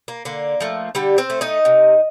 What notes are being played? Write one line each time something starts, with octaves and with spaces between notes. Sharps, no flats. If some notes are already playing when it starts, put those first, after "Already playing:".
A#3
D3 A#3
F3 A3
D3 G3 G4
C4 C5
A3
D#4 D#5
C3